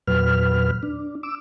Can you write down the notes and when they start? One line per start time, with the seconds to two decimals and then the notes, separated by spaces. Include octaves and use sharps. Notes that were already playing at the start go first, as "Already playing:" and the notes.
0.07 E2 A#2 F#3 B4 F6
0.83 D4
1.23 D6 E6